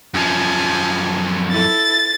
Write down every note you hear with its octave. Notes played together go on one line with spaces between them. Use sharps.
F#2 F3 G#5 A5
E4 A4 A6